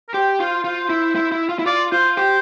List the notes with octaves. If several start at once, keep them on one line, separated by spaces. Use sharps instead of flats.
A#4
G4 C5
F4 C5
F4 C5
E4
E4
E4
F4
E4
F4 D5
F4 C5
G4 C5